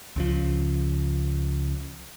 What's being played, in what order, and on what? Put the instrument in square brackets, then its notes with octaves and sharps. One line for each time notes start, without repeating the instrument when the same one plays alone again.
[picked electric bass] C#2 C#3 F3